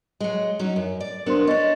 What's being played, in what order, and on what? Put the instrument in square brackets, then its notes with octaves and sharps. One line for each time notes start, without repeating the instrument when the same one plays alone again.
[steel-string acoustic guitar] F#3 G#3
F#3 C#4 D#4
F#2
D5
[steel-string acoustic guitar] F#3 B3 D4 [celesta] A#4 C5 C6
[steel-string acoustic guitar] C#4 D4 [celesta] D#5 C#6 A6